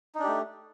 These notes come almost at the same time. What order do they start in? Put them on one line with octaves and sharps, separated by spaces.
D#4 D4 G4 A3